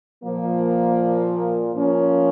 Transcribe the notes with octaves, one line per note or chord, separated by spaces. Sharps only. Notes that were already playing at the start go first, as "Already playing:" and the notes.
A#2 F3 A#3
F3 A#3 C#4